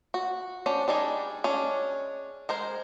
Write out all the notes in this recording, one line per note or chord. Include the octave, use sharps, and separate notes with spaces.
F#4
C#4 D4 C5 F#5
G3 D4 D#4 G#4
G#3 C#4 D4
G#3 A#4 C5